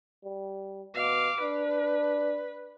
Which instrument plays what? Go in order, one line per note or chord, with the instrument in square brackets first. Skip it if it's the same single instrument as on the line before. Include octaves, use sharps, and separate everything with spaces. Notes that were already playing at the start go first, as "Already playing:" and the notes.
[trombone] G3
[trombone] B2 [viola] F5 D6
[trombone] D4 [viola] B4